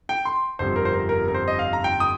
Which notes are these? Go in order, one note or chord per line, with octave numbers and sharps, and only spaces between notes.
G5
C6
G1 F2 C3 G3 C5
A#4
C5
A#4
A#4
A#4
C5
D#5
F5
A#5
G5
D#6